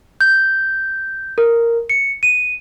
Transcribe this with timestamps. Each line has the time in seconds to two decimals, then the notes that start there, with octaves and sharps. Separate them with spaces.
0.21 G6
1.38 A#4
1.89 C#7
2.23 D#7